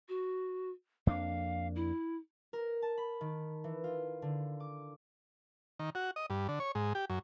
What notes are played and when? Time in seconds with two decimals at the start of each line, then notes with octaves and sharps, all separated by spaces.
0.09 F#4
1.07 F2 A#3 D4 F5
1.76 E4
2.53 A#4
2.82 A5
2.97 B5
3.21 D#3
3.64 E3
3.84 F4
4.22 D3
4.60 D6
5.79 D#3
5.95 F#4
6.16 D#5
6.30 G2
6.49 D3
6.60 C#5
6.75 G#2
6.95 G4
7.10 F#2